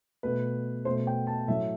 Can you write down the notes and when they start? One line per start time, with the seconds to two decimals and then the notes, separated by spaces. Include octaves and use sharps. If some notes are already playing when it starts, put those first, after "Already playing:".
0.23 B2 A3 B4
0.85 B2 A3 C5
1.07 G5
1.27 A5
1.48 A2 F#3 A3 E5